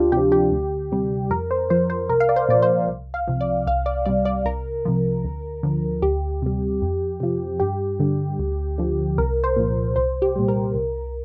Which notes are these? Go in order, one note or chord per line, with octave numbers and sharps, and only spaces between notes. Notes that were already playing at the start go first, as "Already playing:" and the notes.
Already playing: D2 D4 F4 G4
C3 F3 G4
G4
D2
C3 G3
F2 A#4
C5
F3 C5
C5
C2 A#4
F5
D5
C5
A#2 F3 D5
C5
C2
F5
C3 F3
D5
C2 F5
D5
C3 G3 D5
D5
C2 A#4
C3 F3
D2
D3 F3
D2 G4
C3 G3
F2
C3 F3
G2 G4
D3 G3
D2
D3 F3
C2 A#4
C5
A#2 F3
C2 C5
G4
A#2 G3
A#4
C2